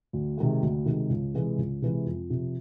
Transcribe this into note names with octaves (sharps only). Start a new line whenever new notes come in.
D2
C3 D#3 G#3
D2
C3 D#3 G#3
C#2
C3 E3 G#3
C#2
C3 E3 G#3
F2
C3 F3